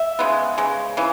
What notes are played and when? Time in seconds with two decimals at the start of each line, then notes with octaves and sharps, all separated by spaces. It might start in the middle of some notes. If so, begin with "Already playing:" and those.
Already playing: E5
0.19 C#3 G#3 B3
0.58 C#3 G#3
0.97 C#3 E3